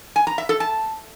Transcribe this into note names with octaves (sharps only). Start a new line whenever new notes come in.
G#5
A#5
E5
A4
A5